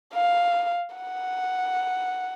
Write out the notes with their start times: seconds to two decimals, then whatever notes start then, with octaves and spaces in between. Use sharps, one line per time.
0.14 F5
0.96 F#5